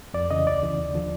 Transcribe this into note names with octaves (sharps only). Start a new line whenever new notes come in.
F2 D5
C#3 E3 D#5
D2 D5
C#3 E3
D#2
D3 F3